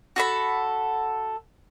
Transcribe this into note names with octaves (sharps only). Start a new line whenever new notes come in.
F#4 A4 B5